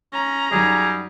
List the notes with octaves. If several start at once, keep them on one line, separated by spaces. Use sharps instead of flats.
C#4 A#5
F#2 D#3 F#3 G3 G#4